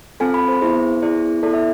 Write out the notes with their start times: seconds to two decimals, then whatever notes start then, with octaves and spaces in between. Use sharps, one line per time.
0.20 C4 F4 A4 G#5
0.34 B5
0.48 C5
0.62 B3 E4 G#4 C5
1.02 B3 E4 G#4 D5
1.43 B3 E4 A4 D5
1.54 E5